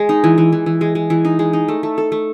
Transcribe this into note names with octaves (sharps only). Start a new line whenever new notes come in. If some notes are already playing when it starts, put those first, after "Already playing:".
Already playing: G#3
D#4
E3
E3
E3
E3
G#3
G#3
E3
D#4
G#3
D#4
A3
A3
A4
A3